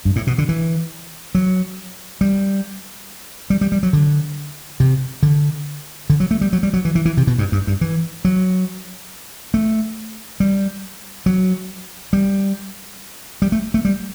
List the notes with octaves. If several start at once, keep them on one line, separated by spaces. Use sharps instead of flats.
G2
A2
B2
D3
E3
F#3
G3
G3
G3
G3
F#3
D3
C3
D3
D3
F#3
A3
G3
F#3
G3
F#3
E3
E3
E3
C3
B2
G2
G2
G2
E3
F#3
A3
G3
F#3
G3
G3
A3
A3
G3